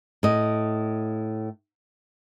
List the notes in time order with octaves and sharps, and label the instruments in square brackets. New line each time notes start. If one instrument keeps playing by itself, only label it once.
[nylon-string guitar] A2 D#5